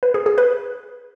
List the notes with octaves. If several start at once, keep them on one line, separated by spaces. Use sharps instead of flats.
B4
G#4
G#4
B4